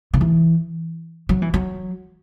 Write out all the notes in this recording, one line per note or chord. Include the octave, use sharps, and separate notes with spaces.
C#3
E3
F#3
E3
F#3